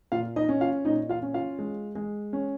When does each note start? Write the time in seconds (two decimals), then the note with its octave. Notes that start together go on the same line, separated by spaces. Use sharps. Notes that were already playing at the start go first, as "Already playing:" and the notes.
0.12 A#2 F4 F5
0.36 D#4 D#5
0.49 C#4
0.61 F4 F5
0.85 A#2 D#4 D#5
1.09 F4 F5
1.22 C#4
1.34 F4 F5
1.59 G#3
1.95 G#3
2.33 C#4